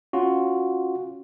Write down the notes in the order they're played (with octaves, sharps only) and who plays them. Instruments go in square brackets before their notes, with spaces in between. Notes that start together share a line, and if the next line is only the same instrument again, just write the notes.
[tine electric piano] C#4 F4 F#4